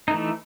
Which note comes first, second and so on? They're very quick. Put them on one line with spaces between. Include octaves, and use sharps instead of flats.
D#4 A3 E3